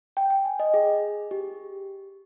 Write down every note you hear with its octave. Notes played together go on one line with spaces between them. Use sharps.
G5
G5
G#5
D#5
G#4
G4